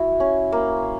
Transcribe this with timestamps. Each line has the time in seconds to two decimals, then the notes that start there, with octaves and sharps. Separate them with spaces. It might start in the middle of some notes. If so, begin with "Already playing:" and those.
Already playing: E4 F#4
0.20 C#4
0.52 A#3